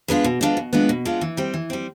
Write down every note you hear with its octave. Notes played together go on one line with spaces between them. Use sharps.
G#3 B3 D4 F4
B2
G#3 B3 D4 F4
B2
G#3 B3 D4 F4
B2
G#3 B3 D4 F4
E3
G3 C4
E3
G3 C4